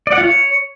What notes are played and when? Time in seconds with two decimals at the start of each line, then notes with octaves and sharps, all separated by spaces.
0.07 D5
0.12 F#5
0.18 F4
0.23 C#5